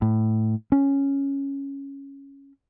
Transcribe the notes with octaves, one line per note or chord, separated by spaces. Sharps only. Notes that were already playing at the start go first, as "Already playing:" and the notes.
A2
C#4